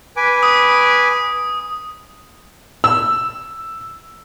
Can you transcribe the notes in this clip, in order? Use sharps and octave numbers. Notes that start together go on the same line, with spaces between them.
B4 G#5 D6
D#6
E6